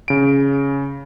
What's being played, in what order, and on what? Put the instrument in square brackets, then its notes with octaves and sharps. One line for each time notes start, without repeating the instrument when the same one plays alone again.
[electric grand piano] C#3 D7